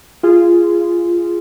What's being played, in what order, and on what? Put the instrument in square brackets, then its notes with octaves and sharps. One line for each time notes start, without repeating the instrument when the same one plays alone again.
[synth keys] F4 G#4